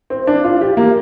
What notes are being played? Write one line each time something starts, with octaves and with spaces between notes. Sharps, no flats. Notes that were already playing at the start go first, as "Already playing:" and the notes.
C4
D4
F4
G4
A#3